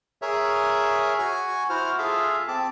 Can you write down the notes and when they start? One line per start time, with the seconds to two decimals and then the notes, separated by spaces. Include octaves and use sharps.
0.22 G#4 A#4 C#5 E5
1.19 F#4 G#5 C#6
1.70 E4 F#4 C5 F6
1.98 F4 G#4 A4 E5 F5
2.48 C4 A5 D6